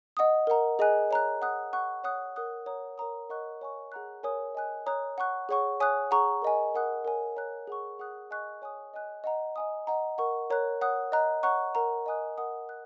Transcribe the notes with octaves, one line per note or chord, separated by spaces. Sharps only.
D#5 F#5 D#6
A#4 F#5 A#5
G#4 D#5 G#5 F#6
C#5 A#5 F#6
F#5 D#6 F#6
F#5 C#6 F#6
C#5 F#5 D#6 F#6
A#4 F#5 D#6 F#6
C#5 F#5 A#5 D#6
A#4 C#5 A#5 D#6
A#4 D#5 F#5 C#6 F#6
C#5 G#5 C#6
G#4 F#5 A#5 F#6
A#4 C#5 G#5 D#6
D#5 G#5 F#6
C#5 A#5 D#6 F#6
F#5 C#6 F#6
G#4 C#5 F#5 C#6
C#5 G#5 D#6 F#6
G#4 F#5 A#5 C#6
A#4 D#5 G#5
A#4 F#5 D#6 F#6
A#4 C#5 G#5
C#5 A#5 F#6
G#4 F#5 C#6
G#4 F#5 D#6 F#6
D#5 G#5 C#6 F#6
C#5 G#5 D#6
D#5 G#5 F#6
D#5 F#5 A#5
D#5 G#5 D#6
D#5 F#5 A#5
A#4 F#5 C#6
A#4 C#5 A#5 F#6
C#5 F#5 D#6 F#6
D#5 A#5 F#6
C#5 F#5 A#5 C#6 F#6
A#4 F#5 A#5
D#5 G#5 D#6 F#6
A#4 F#5 D#6
F#6